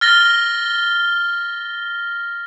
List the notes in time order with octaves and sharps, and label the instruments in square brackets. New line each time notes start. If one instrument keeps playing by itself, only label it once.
[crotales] F6 A6 A#6 G7